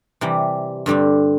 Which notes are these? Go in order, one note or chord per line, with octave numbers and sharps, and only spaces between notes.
C3 E3 G3
G2 D3 G3 C4